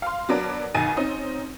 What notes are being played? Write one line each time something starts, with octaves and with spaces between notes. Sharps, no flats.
F5 C6
F#3 B3 D4 A#4 D5
B1 D#3 D#4 G#5 A6 D#7
C4 C#4 D#4